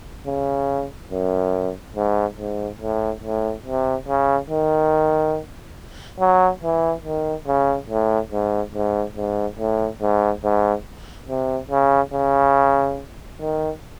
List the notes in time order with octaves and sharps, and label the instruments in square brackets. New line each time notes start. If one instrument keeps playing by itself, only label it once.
[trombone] C#3
F#2
G#2
G#2
A2
A2
C3
C#3
D#3
F#3
E3
D#3
C#3
A2
G#2
G#2
G#2
A2
G#2
G#2
C3
C#3
C#3
D#3